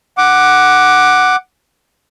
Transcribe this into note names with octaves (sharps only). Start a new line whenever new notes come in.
F#5 D6